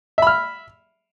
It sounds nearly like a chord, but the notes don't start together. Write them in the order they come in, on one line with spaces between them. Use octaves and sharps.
E5 B5 F6